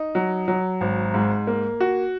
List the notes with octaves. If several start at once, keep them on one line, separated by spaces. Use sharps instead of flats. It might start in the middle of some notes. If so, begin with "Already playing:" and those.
Already playing: D#4
F#3
F#3
G#1
G#2
A#3
F#4